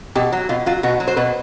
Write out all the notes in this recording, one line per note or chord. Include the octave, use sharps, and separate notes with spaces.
B2 G4
F#3
B2 F4
F#3 F4
B2 F#4
F#3
C5
B2 B4